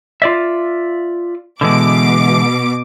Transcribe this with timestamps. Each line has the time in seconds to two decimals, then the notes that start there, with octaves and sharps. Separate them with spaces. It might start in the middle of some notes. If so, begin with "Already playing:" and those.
0.22 F4 D5 E5
1.61 B2 D3 E3 G#3 D6